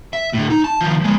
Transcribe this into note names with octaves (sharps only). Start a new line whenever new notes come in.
E5
A2 D3
D#4
A5
D#3 F3
F3 G#3